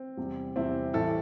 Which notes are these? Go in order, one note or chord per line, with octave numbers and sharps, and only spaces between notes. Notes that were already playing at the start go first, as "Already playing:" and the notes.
Already playing: C4
E2 C3 G3
E2 C3 G3 C4 E4
A1 A2 E3 G3 E4 A4